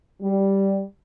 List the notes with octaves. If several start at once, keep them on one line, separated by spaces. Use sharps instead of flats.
G3